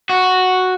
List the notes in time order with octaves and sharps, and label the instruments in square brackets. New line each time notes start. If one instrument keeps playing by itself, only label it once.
[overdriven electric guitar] F#4